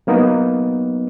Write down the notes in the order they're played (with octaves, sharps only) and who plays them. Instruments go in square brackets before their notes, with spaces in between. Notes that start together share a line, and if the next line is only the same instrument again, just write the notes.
[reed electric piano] F#3 A#3 B3 D#4